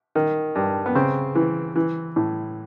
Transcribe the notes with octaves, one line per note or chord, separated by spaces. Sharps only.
D#3
G2
B3
C#3 C4
E3
E3
A2